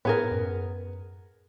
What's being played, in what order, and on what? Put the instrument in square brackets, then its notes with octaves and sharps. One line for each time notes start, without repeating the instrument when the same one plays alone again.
[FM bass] A2 [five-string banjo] B3 G#4 A#4
[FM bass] F#2